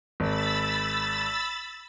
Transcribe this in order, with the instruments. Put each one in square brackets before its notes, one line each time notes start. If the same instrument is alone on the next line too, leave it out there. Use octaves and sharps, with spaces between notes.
[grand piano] G#1 [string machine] B5 E6 A6